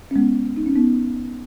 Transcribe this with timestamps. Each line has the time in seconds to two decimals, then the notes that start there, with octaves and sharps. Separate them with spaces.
0.11 C#4
0.16 G#3 B3
0.56 D#4
0.66 C#4
0.75 B3 D#4